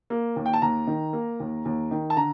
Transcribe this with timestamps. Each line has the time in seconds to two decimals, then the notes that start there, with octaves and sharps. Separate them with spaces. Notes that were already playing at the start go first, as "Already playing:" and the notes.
0.10 A#3
0.36 D#2
0.46 G5
0.53 A5
0.62 D#2 A#5
0.87 D#3
1.13 A#3
1.40 D#2
1.65 D#2
1.91 D#3
2.10 A5
2.17 D3 A#5